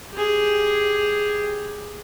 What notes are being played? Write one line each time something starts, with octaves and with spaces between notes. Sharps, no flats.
G4 G#4